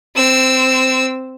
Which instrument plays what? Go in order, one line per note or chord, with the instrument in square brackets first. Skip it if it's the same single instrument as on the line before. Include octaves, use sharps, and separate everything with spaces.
[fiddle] C4 E6